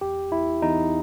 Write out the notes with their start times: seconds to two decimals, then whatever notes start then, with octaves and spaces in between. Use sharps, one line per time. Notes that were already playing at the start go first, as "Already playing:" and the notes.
0.01 E2 G4
0.32 E2 E4
0.62 E2 D#4